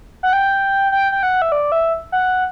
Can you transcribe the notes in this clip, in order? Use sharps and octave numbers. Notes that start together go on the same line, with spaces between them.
F#5
G5
G5
G5
F#5
E5
D5
E5
F#5